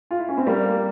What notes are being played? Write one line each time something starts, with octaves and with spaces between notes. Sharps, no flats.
F4
E4
C#4
C4
G3 A#3